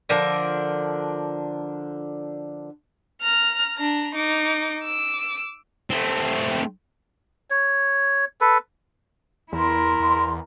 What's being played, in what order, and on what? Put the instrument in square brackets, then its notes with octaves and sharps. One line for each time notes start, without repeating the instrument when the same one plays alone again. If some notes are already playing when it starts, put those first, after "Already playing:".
[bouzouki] D3 F3 D4 A#4
[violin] A#5 F6
D4 A#5
D#4 D6
D6 E6
[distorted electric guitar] A3 C4
[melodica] C#5
A4 B4
[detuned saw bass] E2 [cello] E4 A#4 [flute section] C6
[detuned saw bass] E2